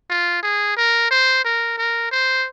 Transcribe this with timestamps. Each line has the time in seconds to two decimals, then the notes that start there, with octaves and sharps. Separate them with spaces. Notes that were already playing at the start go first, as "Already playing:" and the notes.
0.10 F4
0.43 G#4
0.77 A#4
1.10 C5
1.45 A#4
1.78 A#4
2.12 C5